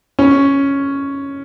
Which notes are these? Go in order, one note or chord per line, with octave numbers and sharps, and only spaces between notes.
C#4